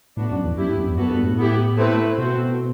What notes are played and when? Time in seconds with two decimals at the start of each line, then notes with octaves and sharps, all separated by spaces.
0.17 A2 B3 D4 F#4
0.31 F#2
0.44 E2
0.57 F#2 B3 E4 G4
0.67 G2
0.78 F#2
0.88 E2
0.97 F#2 B3 F#4 A4
1.10 G2
1.23 A2
1.38 B3 E4 G4
1.77 A3 C4 E4 B4
2.17 B2 A3 C4 F#4 C5